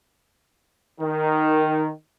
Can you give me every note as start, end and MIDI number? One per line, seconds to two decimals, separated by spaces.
1.00 1.90 51